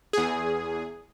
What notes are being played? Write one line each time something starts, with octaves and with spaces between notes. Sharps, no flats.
E2 G#4